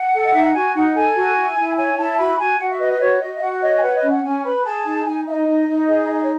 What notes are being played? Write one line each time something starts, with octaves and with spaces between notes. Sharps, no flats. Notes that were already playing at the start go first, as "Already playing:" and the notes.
Already playing: F#5
A4
D#5
D#4 E5
F#5
F#4 G#5
D#4 F#5
A4 G#5
F#4
E4
E4
C#5 G#5
E4 A5
F#4 B5
F#4 G#5
F#4 F#5
E5
B4 D#5
D#5
F#4 C#5
F#4 D#5
E5
F#4 F#5
C#5 D#5
G#5
B4 F#5
D#5
C#4
F#5
C#4 G#5
B4 B5
G#4 A5
D#4
D#4 G#5
D#4 E5
D#5
D#4
D#4
G#4
D#4
C#5